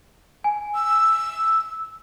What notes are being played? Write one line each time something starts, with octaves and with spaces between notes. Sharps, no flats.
G#5
E6